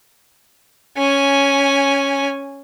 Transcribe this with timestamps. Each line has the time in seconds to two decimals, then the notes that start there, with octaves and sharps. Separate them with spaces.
0.97 C#4 G#5